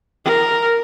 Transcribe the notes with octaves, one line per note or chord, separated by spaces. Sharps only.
A#4